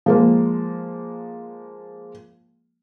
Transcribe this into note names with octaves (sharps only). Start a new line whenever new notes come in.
F3 G#3 A#3